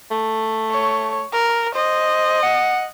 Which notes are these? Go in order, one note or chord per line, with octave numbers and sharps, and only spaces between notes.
A3
C#5
A#4
C5 D#5
F#5